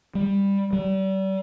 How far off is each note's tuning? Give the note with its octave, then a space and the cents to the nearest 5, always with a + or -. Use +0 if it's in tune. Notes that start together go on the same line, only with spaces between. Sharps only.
G3 +15
G3 -35